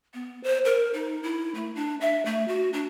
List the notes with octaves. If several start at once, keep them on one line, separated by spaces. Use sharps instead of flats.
B3
C5
A#4
D#4
E4
A3
D4
E5
A3
F#4
D4